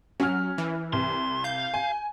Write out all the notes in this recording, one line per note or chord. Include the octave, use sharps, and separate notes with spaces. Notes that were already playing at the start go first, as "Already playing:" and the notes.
F#3 C#4 F6
E3
C2 C6
F5 G6
G#5